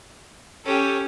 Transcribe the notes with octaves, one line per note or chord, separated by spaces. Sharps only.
C#4 G4 A4